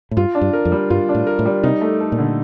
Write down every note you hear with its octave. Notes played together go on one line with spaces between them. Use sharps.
A2
G2 F4
D4
G2
A#4
F2
G3
G2 F4
D4
A2
A#4
A2
G3
C3 D#4
A3
A4
A#2
D3